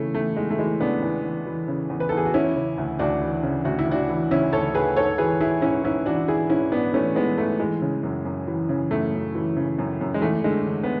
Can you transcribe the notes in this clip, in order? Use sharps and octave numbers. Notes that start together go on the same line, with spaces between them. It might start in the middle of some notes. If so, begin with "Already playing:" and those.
Already playing: C#3 E3 A3
E2 A3
E2 G#3
A3
E3 G#3
C#3 B3 D4
E2
E2
E3
C#3
E2
B4
E2 A4
G#4
F#4
E3 C#4 E4
C#3
D2
D2 D4 F#4
E3
C#3
D2 F#4
E4
D2 D4 F#4
E3
C#3 C#4 E4
D2 A4 C#5
D2 G#4 B4
G#2 A4 C#5
E3 G#4 B4
E3 E4 G#4
G#2 C#4 E4
G#2 C#4 E4
E3 D4 F#4
E3 E4 G#4
G#2 C#4 E4
G#2 B3 D4
E3 A3 C#4
E3 G#3 B3
G#2 A3
E3 G#3
C#3
F#2
F#2
E3
C#3
F#2 A3
F#2
E3
C#3
F#2
F#2
G#3
E2 A3
D3 G#3
D3
B3